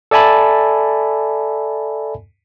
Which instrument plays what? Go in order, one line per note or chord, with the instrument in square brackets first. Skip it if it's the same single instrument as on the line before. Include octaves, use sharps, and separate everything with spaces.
[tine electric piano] A4 D5 E5 G#5 A5 B5